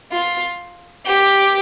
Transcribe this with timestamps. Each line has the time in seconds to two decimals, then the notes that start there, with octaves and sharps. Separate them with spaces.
0.12 F4
1.06 G4